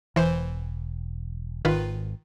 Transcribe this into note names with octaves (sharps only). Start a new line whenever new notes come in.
E1 E3 C5
G#1 D#3 F4 B4